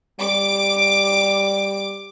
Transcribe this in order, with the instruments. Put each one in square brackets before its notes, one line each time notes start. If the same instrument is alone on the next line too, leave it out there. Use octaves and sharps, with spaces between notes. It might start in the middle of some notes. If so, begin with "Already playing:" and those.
[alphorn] G3 [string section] D6